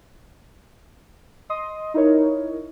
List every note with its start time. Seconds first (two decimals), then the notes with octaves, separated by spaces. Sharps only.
1.50 D#5 C6 D#6
1.94 D#4 E4 A#4 C#5